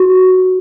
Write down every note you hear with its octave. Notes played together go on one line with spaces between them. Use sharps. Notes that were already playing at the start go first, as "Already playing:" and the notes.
Already playing: F#4